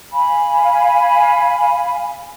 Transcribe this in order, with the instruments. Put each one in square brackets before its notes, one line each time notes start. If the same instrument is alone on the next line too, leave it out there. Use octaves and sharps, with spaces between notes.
[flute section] F5 G#5 B5